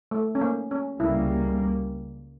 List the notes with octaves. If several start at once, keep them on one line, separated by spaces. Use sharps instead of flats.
A3
C#4
A#3
C#4
C#2 C#3 G3 A#3 E4